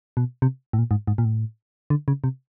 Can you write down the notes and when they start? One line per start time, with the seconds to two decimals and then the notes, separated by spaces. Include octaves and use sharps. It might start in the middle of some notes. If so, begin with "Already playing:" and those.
0.17 B2
0.42 C3
0.73 A2
0.79 A#2
0.91 G#2
1.07 G#2
1.18 A#2
1.25 A2
1.90 D3
2.08 C#3
2.24 C3